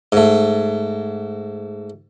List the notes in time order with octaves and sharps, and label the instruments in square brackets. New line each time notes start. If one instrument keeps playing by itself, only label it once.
[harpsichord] G#2 A3